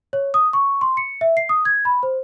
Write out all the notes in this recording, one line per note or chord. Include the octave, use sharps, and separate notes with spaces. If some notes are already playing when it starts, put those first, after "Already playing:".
C#5
D#6
C#6
C6
C#7
E5
C7
D#6
G#6
B5
C5